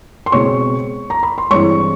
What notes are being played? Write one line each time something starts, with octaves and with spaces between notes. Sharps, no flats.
C6
B2 G#3 C4 C#5 C#6
A#5
B5
C6
G2 E3 G#3 C4 C#5 C#6